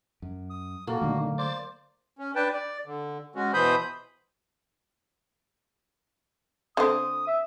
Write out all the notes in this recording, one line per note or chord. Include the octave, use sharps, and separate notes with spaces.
F#2
D#6
A#2 A#3 F4 F#4 A4
A#2 D3 D#3 F#3 A3 D4
C5 D5 C6 D6 A6
C#4
D4 B4 G5 A5
D5
D3
G#3 C#4 F#4
B2 E3 C5 B5 D#6 G6
D3 C4 D#6
E5